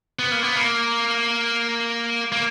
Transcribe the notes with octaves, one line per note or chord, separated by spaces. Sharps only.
B3
A#3
B3
A#3
A#3